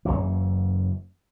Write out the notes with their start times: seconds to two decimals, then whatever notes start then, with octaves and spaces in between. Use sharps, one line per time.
0.05 F#1 C#2 F#2 E3